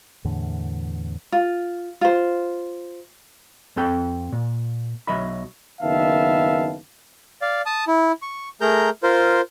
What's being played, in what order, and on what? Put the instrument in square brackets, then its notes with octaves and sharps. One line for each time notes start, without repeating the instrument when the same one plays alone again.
[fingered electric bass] E2 A2 D3
[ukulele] F4
F4 C5
[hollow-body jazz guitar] F2 C4 A4 G5
A#2
B1 F#3 D#5 E5 B5
[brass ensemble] F#1 D#3 B3 E5 F5 A5
[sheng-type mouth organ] D5 F5
A5 D#6
E4
C#6
A3 G#4 A#4 A#5 G6
F4 A#4 C5